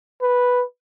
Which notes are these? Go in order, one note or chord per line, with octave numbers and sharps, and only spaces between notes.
B4